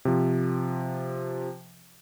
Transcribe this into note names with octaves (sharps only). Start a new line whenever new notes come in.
C3 F3